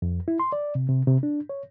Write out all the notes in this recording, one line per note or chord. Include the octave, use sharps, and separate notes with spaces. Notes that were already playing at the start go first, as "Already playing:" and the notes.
F2
E4
C6
D5
C3
C3
C3
D4
C#5